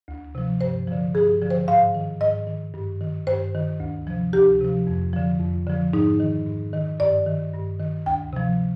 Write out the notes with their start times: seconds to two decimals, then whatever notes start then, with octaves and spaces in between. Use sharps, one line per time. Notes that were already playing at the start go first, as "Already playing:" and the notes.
0.08 D2
0.35 C3 F3
0.61 G2 C5
0.88 D3 F3
1.14 G2 G#4
1.42 D3 F3
1.50 C5
1.68 G#2 F5
1.94 D#3
2.21 G#2 D#5
2.47 D#3
2.74 G2
3.01 D#3
3.27 G2 C5
3.54 D#3
3.80 D2
4.07 C3 F3
4.33 D2 G4
4.61 C3 F3
4.87 F2
5.13 D3 F3
5.40 F2
5.67 D3 F3
5.93 G#2 D#4
6.20 D#3
6.46 G#2
6.73 D#3
7.00 G2 D5
7.26 D#3
7.54 G2
7.80 D#3
8.06 D2 G5
8.33 C3 F3